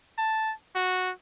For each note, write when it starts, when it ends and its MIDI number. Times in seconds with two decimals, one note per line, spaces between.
0.18 0.53 81
0.75 1.11 66